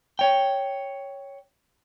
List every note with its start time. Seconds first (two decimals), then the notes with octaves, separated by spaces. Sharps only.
0.19 C#5 G5